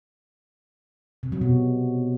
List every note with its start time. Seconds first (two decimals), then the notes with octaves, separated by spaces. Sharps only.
1.23 C3
1.32 F#3
1.41 B2